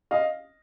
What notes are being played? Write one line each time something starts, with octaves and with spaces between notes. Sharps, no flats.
D#5 F5